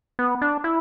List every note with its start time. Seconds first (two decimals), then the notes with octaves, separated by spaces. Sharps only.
0.19 B3
0.42 D4
0.64 E4